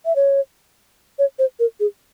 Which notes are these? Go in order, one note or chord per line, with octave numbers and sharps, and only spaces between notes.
E5
C#5
C#5
C5
A#4
G#4